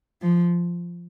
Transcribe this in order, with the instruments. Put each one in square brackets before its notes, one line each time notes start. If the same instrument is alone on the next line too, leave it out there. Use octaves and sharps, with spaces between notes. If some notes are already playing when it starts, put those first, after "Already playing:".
[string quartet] F3